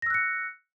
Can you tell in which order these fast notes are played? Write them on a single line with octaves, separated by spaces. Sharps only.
A#6 E6 F#6 C#7